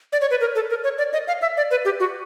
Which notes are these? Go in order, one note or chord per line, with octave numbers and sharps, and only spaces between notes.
D5
C#5
B4
A#4
A4
A#4
C#5
D5
D#5
F5
E5
D5
B4
G4
F#4